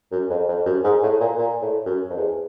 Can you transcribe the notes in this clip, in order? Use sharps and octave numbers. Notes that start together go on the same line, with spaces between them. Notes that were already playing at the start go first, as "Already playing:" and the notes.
F#2
F2
F2
F#2
G#2
A2
A#2
A#2
A2
F#2
F2
E2